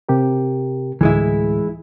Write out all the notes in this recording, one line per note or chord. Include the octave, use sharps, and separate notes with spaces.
C3 G4 A#4
D2 A2 E3 G#3 E4